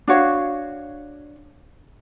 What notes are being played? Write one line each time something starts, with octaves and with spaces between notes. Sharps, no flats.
D4 F#4 C#5 F5